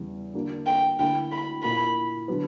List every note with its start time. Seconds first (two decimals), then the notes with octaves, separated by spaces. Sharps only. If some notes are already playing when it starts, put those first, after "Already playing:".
Already playing: E2 C#3 G3
0.34 D3 A#3 D4 F#4
0.67 G5
0.99 D2 D3 A#3 E4 G5
1.32 B5
1.63 A#2 A#3 E4 B5
2.28 D3 F#3 B3